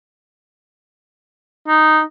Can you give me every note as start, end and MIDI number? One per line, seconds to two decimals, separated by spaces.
1.68 2.01 63